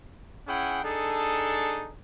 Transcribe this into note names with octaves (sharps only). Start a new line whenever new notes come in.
C#4 E4 G#4 F#5 G5
D4 D#4 G#4 A4